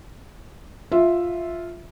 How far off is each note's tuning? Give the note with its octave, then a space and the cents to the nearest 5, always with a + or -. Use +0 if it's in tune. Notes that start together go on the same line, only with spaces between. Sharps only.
F4 +0 E5 +0